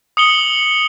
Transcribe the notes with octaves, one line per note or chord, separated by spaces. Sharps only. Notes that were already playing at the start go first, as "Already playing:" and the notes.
D#6 C#7 F#7 G7